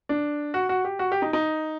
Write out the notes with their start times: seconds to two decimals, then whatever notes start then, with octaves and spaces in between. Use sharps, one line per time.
0.09 D4
0.54 F#4
0.69 F#4
0.85 G4
0.99 F#4
1.12 G4
1.22 D#4
1.33 D#4